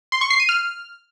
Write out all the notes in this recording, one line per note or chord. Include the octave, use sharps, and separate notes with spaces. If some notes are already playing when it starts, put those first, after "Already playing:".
C6
C#6
C7
D#7
F6